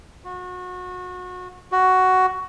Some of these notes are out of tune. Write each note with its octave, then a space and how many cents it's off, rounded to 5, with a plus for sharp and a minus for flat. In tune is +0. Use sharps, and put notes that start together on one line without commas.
F#4 -30
F#4 +10